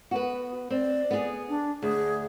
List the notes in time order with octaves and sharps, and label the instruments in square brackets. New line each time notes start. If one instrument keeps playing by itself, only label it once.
[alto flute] B3 [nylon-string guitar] F#4 B4
[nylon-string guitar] C4 [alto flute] D5
[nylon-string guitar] B3 G#4
[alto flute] D4
[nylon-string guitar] D2 [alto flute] G#4